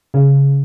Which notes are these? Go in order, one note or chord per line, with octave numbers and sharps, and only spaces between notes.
C#3